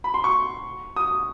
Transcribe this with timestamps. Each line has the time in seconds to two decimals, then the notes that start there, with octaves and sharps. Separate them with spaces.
0.04 B5
0.14 C6
0.24 C#6
0.96 D#6